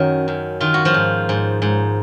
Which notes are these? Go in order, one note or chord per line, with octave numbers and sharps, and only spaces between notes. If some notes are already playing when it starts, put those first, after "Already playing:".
Already playing: F#2 D#3 F#3
F#2
D#3 F4
F#4
F3 F4
G#2
G#2
G#2